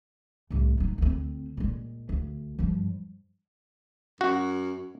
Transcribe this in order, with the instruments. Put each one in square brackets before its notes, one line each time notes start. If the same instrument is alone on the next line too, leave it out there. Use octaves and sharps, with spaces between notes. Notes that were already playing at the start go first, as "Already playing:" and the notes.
[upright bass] C2 A2
F#3 D#4
D2 C4
A#2 G#3
D2
G2 F3
[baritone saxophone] F#2 [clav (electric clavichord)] F#4